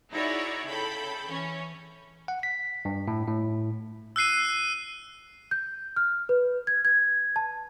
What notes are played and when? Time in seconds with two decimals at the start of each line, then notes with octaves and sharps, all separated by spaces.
0.11 D#4 E4 F#4 G#4 C#5 D5
0.66 C#3 A4 G5 B5 G6
1.27 E3 C#4 C#5
2.28 F#5
2.43 B6
2.85 G2
3.08 A2
3.28 A2
4.16 E6 F#6 C7 D#7
5.51 G6
5.96 F6
6.29 B4
6.67 G#6
6.85 G#6
7.36 A5